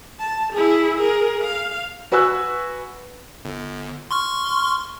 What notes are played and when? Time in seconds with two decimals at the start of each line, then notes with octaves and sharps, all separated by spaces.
0.20 A5
0.53 E4 G#4
0.97 G#4 A#4
1.44 F5
2.12 F#4 B4 G#5 E6 F#6
3.45 G1
4.11 C6 C#6 F6